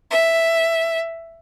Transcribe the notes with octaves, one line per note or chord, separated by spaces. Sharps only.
E5